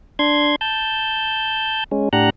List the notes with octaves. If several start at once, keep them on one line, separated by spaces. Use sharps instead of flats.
D4 C6 G#6
A5 G6
G#3 C#4
A2 D4 G4 F#5 A#5 F#6